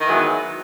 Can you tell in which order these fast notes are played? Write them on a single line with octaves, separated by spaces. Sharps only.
D#3 E3 G#3 F#3 B3